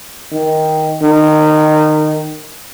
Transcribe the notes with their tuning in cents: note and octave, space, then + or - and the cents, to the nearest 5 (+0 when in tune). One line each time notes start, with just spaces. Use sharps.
D#3 +10
D#3 -20